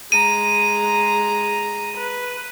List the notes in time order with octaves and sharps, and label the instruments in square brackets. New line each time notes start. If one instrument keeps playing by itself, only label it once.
[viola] G#3 A#5 [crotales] D#7
[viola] B4